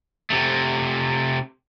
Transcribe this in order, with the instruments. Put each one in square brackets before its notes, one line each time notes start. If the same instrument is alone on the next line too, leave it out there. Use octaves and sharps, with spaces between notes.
[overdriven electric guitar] C3 A3